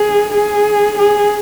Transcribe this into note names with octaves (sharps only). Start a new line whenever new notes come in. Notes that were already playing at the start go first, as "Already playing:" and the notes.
Already playing: G#4
G#4
G#4